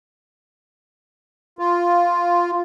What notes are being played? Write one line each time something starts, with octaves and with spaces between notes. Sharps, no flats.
F4